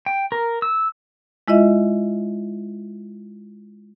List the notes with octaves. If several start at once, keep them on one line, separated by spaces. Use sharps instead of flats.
G5
A#4
E6
G#3 E4 F4 D#5 E5